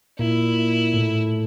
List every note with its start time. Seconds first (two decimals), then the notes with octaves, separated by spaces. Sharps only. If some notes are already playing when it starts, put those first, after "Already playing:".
0.19 A#2 E4
0.94 A2